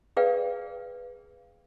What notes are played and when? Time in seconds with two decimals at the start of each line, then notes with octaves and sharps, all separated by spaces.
0.17 G#4 A#4 B4 D5 F5 G5